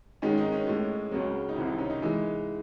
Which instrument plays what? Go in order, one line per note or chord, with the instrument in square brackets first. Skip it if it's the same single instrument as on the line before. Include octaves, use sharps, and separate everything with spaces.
[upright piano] G#2 D#3 G#3 C#4
D#4
C#4
A2 G#3
C#2 C#3 F#3
D#4
C2 C3 D#3 E4
D#4
C#4
D#4
E3 G#3